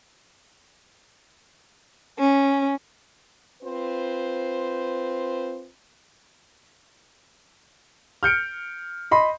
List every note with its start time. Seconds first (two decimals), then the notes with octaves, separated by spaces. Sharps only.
2.20 C#4
3.62 C4 F4 B4 C5
8.23 F6 G6 C#7 D7
9.11 D#5 B5 C6